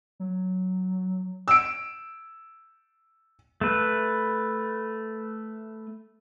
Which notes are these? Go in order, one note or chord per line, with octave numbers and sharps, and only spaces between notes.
F#3
E6 D7
A3 B4